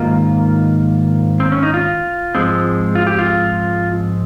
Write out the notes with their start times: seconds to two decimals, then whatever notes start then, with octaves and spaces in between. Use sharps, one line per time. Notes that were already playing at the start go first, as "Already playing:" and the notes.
Already playing: G#2 D#3 A#3 F4
1.40 C4
1.52 C#4
1.63 D#4
1.74 F4
2.35 G#2 F3 G#3 C4
2.95 F4
3.07 G4
3.19 F4